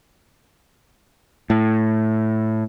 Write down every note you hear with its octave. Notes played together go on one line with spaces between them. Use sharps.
A2